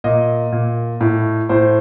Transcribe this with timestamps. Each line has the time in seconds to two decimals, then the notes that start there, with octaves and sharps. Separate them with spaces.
0.04 A#2 D#5
0.52 A#2
1.01 A2
1.49 A2 C5